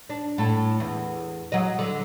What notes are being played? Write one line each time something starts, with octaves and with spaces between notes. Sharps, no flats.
D4
A2 A4
E2
F#3 D#5
D3